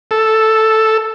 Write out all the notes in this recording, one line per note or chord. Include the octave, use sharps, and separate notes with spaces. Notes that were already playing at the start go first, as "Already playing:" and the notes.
A4